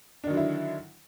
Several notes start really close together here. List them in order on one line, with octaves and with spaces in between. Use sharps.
D4 D#3 F#3 D3 E4